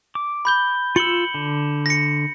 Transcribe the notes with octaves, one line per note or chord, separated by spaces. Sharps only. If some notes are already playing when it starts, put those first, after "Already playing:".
D6
B5 G6 G7
F4 E6 C#7 F#7 G7
D3
A#6 C#7